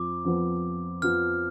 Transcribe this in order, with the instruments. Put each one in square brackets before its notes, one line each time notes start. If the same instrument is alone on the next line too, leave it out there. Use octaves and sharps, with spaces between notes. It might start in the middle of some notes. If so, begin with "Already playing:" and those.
Already playing: [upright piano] F2 F3 [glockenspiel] D6
[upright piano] F2 F3 B3
[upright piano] F2 F3 B3 [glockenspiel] F6